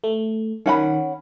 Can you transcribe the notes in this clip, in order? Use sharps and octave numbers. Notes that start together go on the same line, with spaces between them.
A3
D#3 C#4 F#5 B5